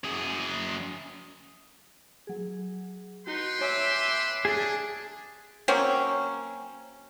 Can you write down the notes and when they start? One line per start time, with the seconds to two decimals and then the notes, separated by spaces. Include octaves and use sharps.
0.04 F#2 G#4
2.27 F#3 G#4
3.27 D#4 F#4 B4 G5 C6 G7
3.61 C#5 E5 G#5 D6
4.45 D4 G#4
5.68 F#3 A#3 C4 C#4